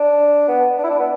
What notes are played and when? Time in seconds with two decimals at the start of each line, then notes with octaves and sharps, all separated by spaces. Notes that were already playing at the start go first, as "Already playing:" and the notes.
Already playing: D4
0.48 B3
0.79 D4
0.84 E4
0.90 D4
1.00 B3